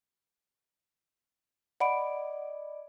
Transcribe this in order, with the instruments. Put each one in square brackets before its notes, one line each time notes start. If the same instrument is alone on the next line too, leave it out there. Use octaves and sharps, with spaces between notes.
[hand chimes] D5 D#5 D6 [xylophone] F#5 B5 D7